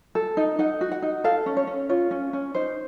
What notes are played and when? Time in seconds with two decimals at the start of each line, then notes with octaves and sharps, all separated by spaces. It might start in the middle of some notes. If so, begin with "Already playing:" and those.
0.15 A4
0.37 D#4
0.59 D#4 F#5
0.81 F#4
0.91 F#5
1.02 D#4
1.24 A4 F5
1.46 C#4
1.57 C#5
1.67 C#4
1.89 F4 C#5
2.11 C#4
2.33 C#4
2.54 D#4 C5